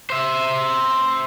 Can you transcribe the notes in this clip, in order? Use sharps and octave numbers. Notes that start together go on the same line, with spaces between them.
C5 E5